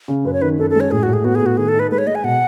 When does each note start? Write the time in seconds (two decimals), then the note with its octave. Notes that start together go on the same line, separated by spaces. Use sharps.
0.08 C#3
0.25 F#2 B4
0.33 C#5
0.42 D#3 B4
0.58 F#2 A4
0.70 A4
0.75 G#3 C#5
0.91 A2 G#4
1.03 A2 F#4
1.13 G#4
1.24 B3 F#4
1.35 G#4
1.42 A2 F#4
1.57 D#3 G#4
1.68 A4
1.74 D#4
1.79 B4
1.91 G#3 B4
1.98 C#5
2.07 G#3 D#5
2.15 G#5
2.24 B2 F#5